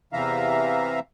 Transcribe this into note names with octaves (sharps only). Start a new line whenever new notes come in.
E2 C3 E3 E5 F5 A#5